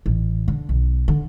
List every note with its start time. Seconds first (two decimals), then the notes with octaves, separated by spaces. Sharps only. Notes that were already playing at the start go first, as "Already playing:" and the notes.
0.06 A1
0.48 D3
0.69 B1
1.08 D3